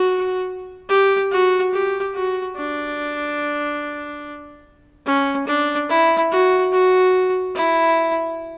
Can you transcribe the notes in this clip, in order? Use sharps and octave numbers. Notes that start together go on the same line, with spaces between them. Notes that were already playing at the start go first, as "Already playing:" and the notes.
Already playing: F#4
G4
F#4
G4
F#4
D4
C#4
D4
E4
F#4
F#4
E4